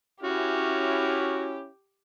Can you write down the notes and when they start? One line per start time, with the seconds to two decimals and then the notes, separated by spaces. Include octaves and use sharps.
0.23 C#4 E4 F#4 G4 F6